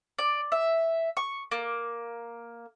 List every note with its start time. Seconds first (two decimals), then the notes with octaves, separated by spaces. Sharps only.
0.19 D5
0.52 E5
1.17 C#6
1.51 A#3